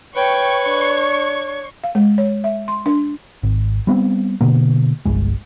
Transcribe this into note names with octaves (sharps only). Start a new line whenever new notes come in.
B4 C#5 G5 C#6
D4
F5
G#3
C#5
E5
C6
D4
G#1
G3 B3 C4
B2 D3 A#3
G1 C2 G#3